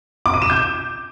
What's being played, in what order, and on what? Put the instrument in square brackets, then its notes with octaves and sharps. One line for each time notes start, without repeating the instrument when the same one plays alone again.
[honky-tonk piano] D6
D#7
E7
G6